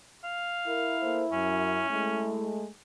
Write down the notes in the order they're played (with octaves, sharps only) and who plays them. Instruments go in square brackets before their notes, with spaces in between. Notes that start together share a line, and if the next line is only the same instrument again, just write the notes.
[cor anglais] F5
[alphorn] E4 [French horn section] A#4
[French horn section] A#3 A4 C5
[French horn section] F#2 [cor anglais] C#4
[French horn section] G#3 A3 [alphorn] E4